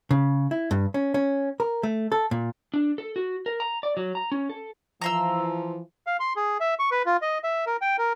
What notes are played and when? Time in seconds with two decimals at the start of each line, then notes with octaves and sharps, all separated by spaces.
0.11 C#3
0.51 E4
0.71 G2
0.94 C#4
1.14 C#4
1.60 A#4
1.83 A3
2.12 A4
2.31 A#2
2.74 D4
2.98 A4
3.16 F#4
3.46 A#4
3.60 A#5
3.83 D5
3.97 F#3
4.15 A#5
4.32 C#4
4.50 A4
5.02 E3 F3 A#5 C6 E6
6.07 F5
6.20 C6
6.36 G#4
6.60 E5
6.79 C#6
6.91 B4
7.06 F4
7.22 D#5
7.44 E5
7.67 A#4
7.81 G5
7.98 A#4